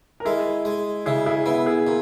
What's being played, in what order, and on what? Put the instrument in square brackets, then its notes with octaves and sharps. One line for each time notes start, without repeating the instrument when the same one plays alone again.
[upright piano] A#4
[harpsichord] G#3 [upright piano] E4 G#4
[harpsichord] G#3
[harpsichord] C#3 [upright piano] E4 G#4
[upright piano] E4 G#4
[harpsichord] B3 [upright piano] E4
[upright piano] E4 G#4
[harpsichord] A#2